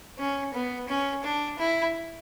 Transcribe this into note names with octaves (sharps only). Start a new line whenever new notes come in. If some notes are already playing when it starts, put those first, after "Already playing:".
C#4
B3
C#4
D4
E4